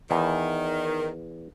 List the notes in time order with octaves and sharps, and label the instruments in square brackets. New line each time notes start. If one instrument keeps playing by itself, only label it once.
[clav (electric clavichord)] E2 [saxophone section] D#3